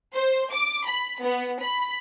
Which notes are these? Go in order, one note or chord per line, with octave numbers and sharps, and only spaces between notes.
C5
D6
B5
B3
B5